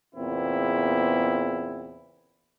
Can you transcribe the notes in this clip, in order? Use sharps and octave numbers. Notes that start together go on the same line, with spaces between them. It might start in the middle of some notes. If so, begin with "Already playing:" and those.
E2 A#2 C#3 B3 C4 E4